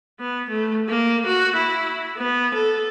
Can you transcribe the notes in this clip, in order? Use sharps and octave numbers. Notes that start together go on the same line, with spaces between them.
B3
A3
A#3
F#4
E4
B3
A4